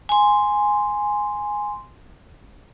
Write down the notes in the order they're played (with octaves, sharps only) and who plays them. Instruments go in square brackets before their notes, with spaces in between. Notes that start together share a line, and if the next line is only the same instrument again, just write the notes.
[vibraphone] G#5 C6